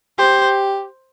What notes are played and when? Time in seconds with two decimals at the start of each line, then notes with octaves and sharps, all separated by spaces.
0.18 G4 C5